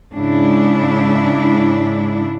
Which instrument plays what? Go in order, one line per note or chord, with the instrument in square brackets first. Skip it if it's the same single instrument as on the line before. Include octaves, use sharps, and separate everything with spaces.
[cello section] G#2 C#3 D4 E4